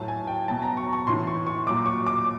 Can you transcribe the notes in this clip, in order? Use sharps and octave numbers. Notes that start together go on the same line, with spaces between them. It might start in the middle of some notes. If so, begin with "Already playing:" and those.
Already playing: A2 F#3 A5
G#5
G5
B2 F#3 A5
A#5
C#6
C#6
A2 E3 C6
C#6
C#6
A#2 F#3 D6
C#6
D6